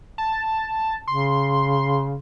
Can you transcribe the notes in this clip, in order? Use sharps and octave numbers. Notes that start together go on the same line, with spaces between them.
A5
C#3 C6